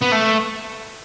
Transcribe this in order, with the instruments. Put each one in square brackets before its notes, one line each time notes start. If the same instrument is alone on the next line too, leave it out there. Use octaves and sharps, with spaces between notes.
[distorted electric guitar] B3
A3